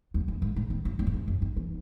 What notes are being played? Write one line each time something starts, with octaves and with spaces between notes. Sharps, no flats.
E2
F#2
G#2
A2
D#3
F#2
E2
G#2
F#2
F#2
D#3
E3